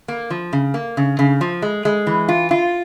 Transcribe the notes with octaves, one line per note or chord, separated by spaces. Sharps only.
A#3
F3
C#3
A#3
C#3
C#3
F3
G#3
G#3
E3
F4
F4